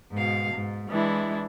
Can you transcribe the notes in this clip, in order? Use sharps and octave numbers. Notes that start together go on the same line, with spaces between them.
G#2 B2 F5
G#2
E3 G#3 D4 E4